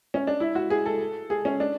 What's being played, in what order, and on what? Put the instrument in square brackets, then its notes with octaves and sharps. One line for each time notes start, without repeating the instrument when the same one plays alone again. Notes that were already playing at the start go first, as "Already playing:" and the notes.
[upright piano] C#4
D4
E4
F#4
G#4
A4
G#4
C#4
D4